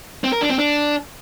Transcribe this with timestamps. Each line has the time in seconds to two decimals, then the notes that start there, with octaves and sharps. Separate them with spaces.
0.24 C4
0.32 A#4
0.41 D4
0.50 C4
0.58 D4